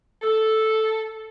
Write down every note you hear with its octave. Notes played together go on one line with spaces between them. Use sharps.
A4